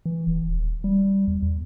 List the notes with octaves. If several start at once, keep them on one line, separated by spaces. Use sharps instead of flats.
E3
D1
D#1
G3
E2
E2